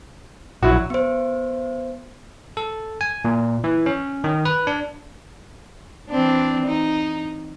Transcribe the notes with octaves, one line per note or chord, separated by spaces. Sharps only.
A#1 F#3 E4 F#4
B3 C5
A4
G#5
A#2
E3
C#4
D#3
B4
D4
E3 C4 D4
D#4